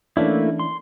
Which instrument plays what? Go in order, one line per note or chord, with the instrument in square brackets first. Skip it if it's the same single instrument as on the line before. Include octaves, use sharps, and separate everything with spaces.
[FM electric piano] E3 C#4 D4 [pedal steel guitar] A3 A#3 E4
[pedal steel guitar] C6